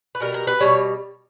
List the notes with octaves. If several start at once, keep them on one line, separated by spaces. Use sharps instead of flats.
B4
B2 G3 A#4
A#4
B4
B2 G3 C#5